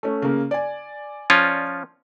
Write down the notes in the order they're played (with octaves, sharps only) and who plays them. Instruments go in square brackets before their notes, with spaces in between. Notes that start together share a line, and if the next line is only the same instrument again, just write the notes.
[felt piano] A3 C#4
C#3 A#3
D5 G#5
[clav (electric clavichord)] F3 C#4 F4